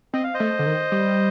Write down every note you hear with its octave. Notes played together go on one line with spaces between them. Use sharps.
C4 D#5
F5
C5 D#5
A3
D3
D#3
G3